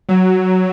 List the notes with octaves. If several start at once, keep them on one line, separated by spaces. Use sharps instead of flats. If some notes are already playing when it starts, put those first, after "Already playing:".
F#3